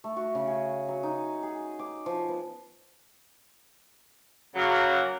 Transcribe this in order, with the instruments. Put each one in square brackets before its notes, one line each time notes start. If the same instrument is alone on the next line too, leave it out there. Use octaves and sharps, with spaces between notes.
[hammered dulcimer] A3
F#4
C#3
G#4
F#3
D#4
G#4
D6
F3
B3
[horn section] C#3 F#3 A#3